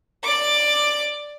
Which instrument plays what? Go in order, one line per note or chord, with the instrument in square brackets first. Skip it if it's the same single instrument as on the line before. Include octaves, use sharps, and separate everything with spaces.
[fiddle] D5 D6